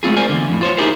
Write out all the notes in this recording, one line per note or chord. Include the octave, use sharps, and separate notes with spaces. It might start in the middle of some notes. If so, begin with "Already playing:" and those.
G#3 A3 C4 F4 G#4
A#4 C5 D5 G#5
E2 D3
F2 A2
F4 C5 C#5
D#4 E4 G4 G#4 A#4 C5